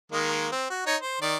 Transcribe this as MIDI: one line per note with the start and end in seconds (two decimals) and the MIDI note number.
0.12 0.47 51
0.12 0.47 56
0.12 0.47 58
0.52 0.67 60
0.70 0.84 66
0.86 0.96 63
0.86 0.96 73
1.01 1.20 72
1.21 1.37 51
1.21 1.37 74